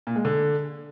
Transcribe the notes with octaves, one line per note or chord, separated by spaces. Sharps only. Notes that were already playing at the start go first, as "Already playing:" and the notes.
A#2
G#3
D3